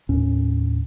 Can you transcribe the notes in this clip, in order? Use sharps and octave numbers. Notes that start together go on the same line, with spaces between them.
D#2 A2 C#4